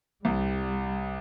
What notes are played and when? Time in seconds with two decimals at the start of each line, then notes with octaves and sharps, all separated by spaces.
0.25 C2 G3